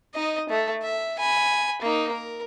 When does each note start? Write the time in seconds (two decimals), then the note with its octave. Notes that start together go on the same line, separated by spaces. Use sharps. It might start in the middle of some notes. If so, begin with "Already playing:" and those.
0.15 D#4 D#5
0.49 A3
0.83 E5
1.19 G#5 B5
1.82 A#3 D#4
2.12 A#4